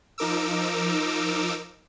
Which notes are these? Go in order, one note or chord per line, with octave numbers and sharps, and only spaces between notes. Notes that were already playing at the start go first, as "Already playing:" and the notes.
F3 D#4 A#4 D6 E6